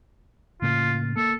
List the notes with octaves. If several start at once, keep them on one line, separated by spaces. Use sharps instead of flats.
A2 C#3 A#3 F4
A#3 A4